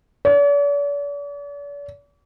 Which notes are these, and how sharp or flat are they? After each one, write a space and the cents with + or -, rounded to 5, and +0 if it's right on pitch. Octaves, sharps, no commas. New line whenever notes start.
D5 -45